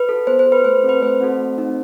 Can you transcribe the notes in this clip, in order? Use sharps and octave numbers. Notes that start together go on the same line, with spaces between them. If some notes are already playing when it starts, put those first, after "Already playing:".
Already playing: B4
F#4 A4
B3 C5
C5
F#4 A4
B4
A3 C5
C4 F#4 A4
B4
A3 C5
C4 F#4 A4
A3
C4 D#4 A4